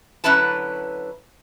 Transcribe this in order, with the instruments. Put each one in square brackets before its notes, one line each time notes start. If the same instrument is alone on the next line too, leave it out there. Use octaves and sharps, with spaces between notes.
[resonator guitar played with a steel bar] D3 F#3 C#4 E4 B4 A5